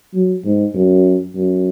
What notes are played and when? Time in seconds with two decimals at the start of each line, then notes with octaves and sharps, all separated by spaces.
0.14 F#3
0.45 G#2
0.75 F#2
1.36 F#2